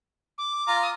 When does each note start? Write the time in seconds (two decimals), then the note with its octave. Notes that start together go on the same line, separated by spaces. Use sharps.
0.38 D6
0.68 F4 A#5
0.82 D#6